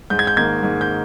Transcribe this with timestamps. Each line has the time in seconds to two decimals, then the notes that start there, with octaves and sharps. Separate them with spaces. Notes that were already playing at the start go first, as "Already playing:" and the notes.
0.10 G#2 G6
0.19 G#6
0.27 G6
0.37 D#3 A#3 G#6
0.63 G#2
0.81 G6